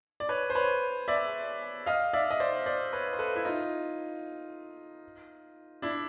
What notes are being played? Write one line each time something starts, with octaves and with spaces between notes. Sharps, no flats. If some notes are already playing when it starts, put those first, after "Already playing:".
D5
B4 C#5
C5
B4 C#5
D5 E5
D#5 F5
D5 E5
D#5
C5 D5
C5 D5
B4 C#5
C5
A4 B4
E4
D#4 F4
D4 E4